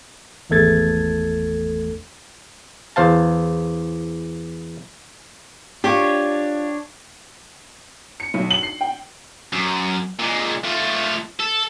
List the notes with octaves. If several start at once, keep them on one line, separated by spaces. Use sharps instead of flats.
G#1 E2 A3 A4 G#6 A6
E2 C5 F5 A5
D4 F4 G4 C#5
C#7
B1
F#7
C7
G5
F#2
A#2 G#3
A3 F4
A4